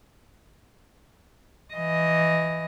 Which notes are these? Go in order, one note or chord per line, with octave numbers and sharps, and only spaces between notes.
E3 D#5